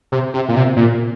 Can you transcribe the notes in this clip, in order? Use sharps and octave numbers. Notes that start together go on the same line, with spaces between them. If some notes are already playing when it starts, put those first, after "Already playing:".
C3
C3
A#2
C3
A#2